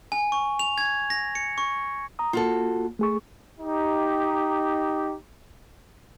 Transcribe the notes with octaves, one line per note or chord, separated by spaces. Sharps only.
G#5
C#6
F7
G#6
A#6
C#7
C#6
A#5 D#6
A#3 F4 F#4 A4
A3 G#4 C#6
D#4 G4